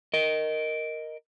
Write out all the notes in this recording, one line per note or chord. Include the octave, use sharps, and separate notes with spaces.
A#4 D#5